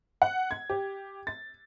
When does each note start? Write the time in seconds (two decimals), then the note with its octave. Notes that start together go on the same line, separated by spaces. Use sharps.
0.22 F#5
0.51 G#6
0.70 G4
1.27 A6